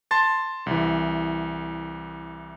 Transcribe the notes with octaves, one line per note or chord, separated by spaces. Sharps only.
A5 C6 A6
C2 E3